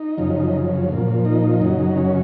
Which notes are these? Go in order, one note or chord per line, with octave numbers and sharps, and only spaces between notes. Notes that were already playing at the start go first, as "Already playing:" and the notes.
Already playing: D#4
F#2 C#3 F3
A#2 F3
D#4
F#2 C#3 F#3
C#4